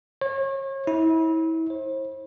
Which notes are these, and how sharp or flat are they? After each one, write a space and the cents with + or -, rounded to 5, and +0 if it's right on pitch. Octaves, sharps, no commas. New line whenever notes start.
C#5 -35
E4 -30
C5 +40